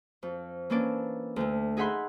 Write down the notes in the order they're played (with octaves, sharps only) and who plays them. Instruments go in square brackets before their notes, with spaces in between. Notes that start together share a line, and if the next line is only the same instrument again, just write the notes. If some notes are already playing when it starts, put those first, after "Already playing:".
[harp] F2
E3 A#3 C#4 D4 D5
D2 A3
D#4 G#4 E5 F#5 B5 C6